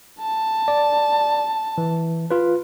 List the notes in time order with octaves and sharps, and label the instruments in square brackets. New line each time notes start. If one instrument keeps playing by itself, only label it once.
[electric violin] A5
[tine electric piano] D5
E3
F4 B4